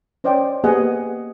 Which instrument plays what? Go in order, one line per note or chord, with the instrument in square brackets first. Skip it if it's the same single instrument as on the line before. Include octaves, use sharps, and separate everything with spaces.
[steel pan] C#4 C5 D5 D#5 G5
A#3 B3 G4 G#4 D#5 F#5